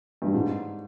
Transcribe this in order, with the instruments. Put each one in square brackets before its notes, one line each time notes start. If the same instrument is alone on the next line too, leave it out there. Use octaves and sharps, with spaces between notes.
[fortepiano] G2
G#2